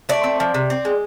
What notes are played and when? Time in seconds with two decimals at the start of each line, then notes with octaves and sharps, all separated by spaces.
0.09 A3 D5
0.24 C4
0.40 F3
0.54 C3
0.70 C4
0.85 G#3